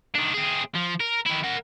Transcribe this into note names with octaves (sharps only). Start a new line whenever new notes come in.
D#3 D4
C4 G#4
F3
A#4
D#3 E4
A#4 F#5